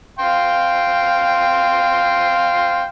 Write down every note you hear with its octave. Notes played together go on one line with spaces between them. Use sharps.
F5 G5 C6